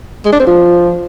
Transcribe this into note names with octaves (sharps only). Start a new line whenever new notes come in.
G#3
D4
C4
F3